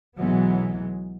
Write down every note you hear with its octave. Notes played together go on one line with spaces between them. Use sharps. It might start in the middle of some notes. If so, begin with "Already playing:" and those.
B1 E3 F#3 G#3 B3